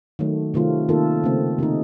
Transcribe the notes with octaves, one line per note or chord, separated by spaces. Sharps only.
D#3 F#3 A3
C3 D#3 A3 C4 F4
D#3 A#3 F4 A4
C#3 A3 C4
C3 D#3 A#3 D#4